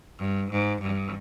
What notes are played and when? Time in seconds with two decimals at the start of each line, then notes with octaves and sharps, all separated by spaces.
0.19 G2
0.51 G#2
0.82 G2